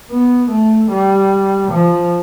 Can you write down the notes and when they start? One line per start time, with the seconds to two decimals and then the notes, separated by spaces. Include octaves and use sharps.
0.11 B3
0.51 A3
0.91 G3
1.72 F3